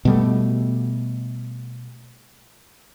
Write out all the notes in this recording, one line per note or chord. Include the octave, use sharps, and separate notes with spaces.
B2 G3 A3